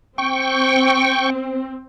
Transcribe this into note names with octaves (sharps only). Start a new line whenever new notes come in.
C4 G5 C#6